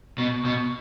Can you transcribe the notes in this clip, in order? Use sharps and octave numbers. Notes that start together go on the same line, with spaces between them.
B2
B2